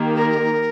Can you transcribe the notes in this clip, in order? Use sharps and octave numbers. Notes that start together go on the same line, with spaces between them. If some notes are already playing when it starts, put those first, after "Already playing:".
Already playing: D#3 A#3 G4
A#4